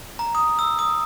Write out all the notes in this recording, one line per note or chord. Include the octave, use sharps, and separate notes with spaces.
A#5
D#6
E6
D#6